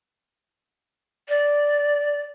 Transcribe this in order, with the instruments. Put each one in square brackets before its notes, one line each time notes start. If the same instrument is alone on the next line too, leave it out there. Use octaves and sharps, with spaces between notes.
[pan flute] D5